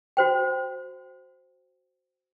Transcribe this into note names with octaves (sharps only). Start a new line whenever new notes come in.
F#4 C5 G5